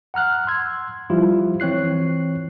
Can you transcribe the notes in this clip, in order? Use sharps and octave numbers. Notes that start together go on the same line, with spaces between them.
F#5 A#5 F6 F#6
C6 E6 G#6
F3 G3 E4 F4 G4
E3 C4 C#5 F#6 C7